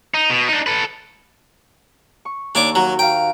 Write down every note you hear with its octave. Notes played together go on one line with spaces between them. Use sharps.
D#4
B2
D4 D#4
A4 B4
C#6
D#2 D4 C#5 D6
F#3 F#4 A#5
F5 G5 A#5